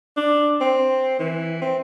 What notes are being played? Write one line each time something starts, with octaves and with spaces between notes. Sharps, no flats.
D4
C4
E3
C4